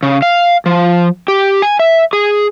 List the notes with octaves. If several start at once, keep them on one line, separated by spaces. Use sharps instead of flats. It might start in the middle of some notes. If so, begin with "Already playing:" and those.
C#3
F5
F3
G4
G#5
E5
G#4